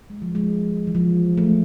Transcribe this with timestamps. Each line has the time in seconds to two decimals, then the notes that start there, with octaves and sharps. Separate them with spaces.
0.10 G#3
0.22 F3
0.35 G#3
0.87 E3
0.95 F3
1.38 A3